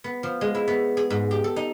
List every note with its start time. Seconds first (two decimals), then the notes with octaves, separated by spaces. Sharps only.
0.04 B3
0.23 F3
0.41 G#3
0.55 E4
0.68 B3
0.97 G#4
1.10 G#2
1.31 G4
1.44 A4
1.56 D#4